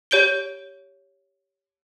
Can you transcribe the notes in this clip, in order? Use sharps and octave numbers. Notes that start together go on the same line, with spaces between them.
G4 C#5 G6 D7 G7